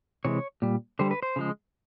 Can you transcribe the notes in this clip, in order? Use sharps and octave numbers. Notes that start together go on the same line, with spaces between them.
C3 E3 G#3 C#5
A#2 G3
D3 G3 C5
B4
C5
C#3 F3 G#3